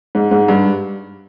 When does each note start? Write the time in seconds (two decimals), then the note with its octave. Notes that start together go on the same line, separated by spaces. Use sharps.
0.15 G#2
0.31 G#2
0.48 G2